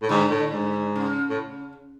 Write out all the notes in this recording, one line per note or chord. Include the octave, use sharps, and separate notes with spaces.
A2
G#2 D3
A2
G#2
C#3
A2